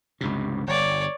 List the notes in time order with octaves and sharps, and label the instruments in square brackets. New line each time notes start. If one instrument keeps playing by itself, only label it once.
[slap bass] C#2 G2 C3
[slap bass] G1 [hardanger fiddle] C#5 D5